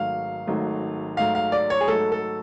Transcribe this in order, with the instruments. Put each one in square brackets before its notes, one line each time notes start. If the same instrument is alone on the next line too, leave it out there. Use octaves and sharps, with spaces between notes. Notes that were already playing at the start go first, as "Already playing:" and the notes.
Already playing: [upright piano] G#1 G#2 F#3 A3 [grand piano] F5
[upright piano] G#1 G#2 F#3 A3
[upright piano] G#2 F#3 A3 [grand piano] F5
[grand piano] F5
D5
C#5
G#4
[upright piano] G#2 F#3 A3 [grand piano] A4
[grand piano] A4